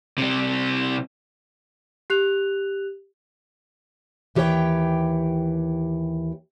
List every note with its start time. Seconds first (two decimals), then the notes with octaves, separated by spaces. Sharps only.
0.18 C3 G3
2.10 G4 F#6 F7
4.35 D#2 E3 G4 A4 C#5 G5